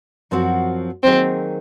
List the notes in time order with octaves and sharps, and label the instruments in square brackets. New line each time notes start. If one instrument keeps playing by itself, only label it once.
[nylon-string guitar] F#2 F3 C4 F#4
[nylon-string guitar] D#3 F#3 A#3 D#4 G#4 [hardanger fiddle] C4